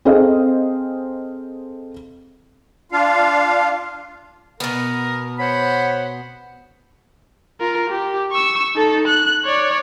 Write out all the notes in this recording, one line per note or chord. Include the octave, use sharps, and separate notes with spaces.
C4 G#4 A4 C5 D#5 F5
D4 F4 F5
B2 B3 A#4
C5 C#5 F#5 B5
F4 A#4
G4
C#6 E6
D#4 A4
F#6
C#5 D5